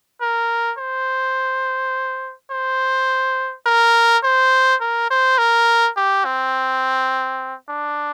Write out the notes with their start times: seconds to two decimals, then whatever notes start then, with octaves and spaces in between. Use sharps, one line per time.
0.21 A#4
0.78 C5
2.51 C5
3.66 A#4
4.24 C5
4.81 A#4
5.11 C5
5.38 A#4
5.96 G4
6.25 C4
7.68 D4